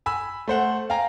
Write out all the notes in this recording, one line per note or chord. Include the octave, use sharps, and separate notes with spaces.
G#5 B5 E6
A3 C5 F#5
F5 G5 G#5 A#5